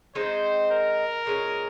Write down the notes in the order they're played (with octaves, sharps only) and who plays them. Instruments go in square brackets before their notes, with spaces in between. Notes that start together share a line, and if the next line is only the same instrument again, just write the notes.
[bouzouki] G#3 C4 D#4 [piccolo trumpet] C5
[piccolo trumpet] A#4
[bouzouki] A#2 G#3 C#4